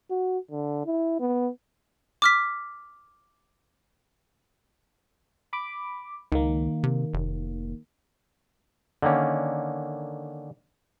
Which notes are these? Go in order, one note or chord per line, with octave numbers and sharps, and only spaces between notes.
F#4
D3
E4
B3
D6 F6 B6
B5 D6
C#2 D#3 A#3
C3
F1
D3 D#3 A#3 C#4